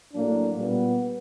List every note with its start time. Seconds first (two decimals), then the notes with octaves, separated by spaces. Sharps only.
0.12 A2 F#3 A#3 D4
0.56 A#2 G3 B3